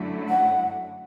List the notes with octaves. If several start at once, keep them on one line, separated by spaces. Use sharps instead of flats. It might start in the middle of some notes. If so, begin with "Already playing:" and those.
Already playing: F#2 D3 F#3 A3 E4
F#5